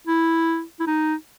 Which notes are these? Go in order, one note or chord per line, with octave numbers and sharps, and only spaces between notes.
E4
E4
D#4